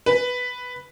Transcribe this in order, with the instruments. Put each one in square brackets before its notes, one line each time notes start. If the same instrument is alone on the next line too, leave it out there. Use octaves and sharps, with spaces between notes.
[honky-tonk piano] B4